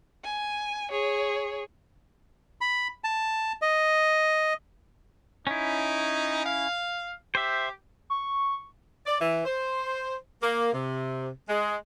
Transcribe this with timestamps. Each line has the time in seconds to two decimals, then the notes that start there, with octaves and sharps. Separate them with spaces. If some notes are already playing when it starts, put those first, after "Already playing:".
0.24 G#5
0.91 G#4 C#5
2.61 B5
3.04 A5
3.62 D#5
5.47 C#4 D#4 E4
6.46 F5
7.35 G4 C5 E5
8.10 C#6
9.07 D5
9.21 E3
9.45 C5
10.42 A#3
10.73 C3
11.49 G#3